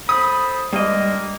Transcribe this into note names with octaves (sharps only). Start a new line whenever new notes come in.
A4 C5 B5 D#6
G2 G#3 A#3 D#5